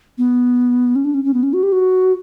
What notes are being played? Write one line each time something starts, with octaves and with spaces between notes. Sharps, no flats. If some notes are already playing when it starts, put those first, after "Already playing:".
B3
C#4
D4
C#4
C#4
B3
C#4
F#4
G4
F#4